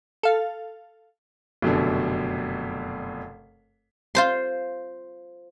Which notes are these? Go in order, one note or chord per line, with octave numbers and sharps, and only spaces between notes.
A4 F5
F1 F#2 B2 D3
F4 C5 C6